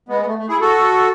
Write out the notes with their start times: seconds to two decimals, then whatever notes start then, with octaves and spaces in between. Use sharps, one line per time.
0.09 G#3 B3
0.21 B3
0.26 A3
0.38 A3
0.49 E4 G#4
0.61 F#4 A4